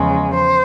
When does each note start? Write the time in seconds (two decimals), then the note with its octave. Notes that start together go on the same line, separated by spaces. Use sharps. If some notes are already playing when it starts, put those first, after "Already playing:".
Already playing: E2 C#3 F3 G#3
0.34 C5